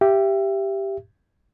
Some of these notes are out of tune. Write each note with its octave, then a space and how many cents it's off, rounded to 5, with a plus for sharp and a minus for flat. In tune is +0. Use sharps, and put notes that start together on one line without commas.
G4 +0 E5 +30